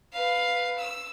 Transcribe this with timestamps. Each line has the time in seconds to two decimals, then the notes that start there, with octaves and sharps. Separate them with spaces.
0.12 B4 F5
0.78 E6